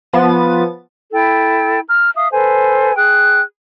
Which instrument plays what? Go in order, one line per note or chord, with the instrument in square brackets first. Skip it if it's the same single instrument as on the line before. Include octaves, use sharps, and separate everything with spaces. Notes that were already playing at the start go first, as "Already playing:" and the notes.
[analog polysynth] F3 B3 A6 D#7
[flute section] E4 A4 G5
A#5 F6
E5 F5 D#6
A4 B4 C5 G#5
G#4 G5 F#6